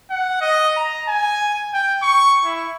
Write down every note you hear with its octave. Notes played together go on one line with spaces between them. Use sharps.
F#5
D#5
A#5
G#5
G5
C#6
E4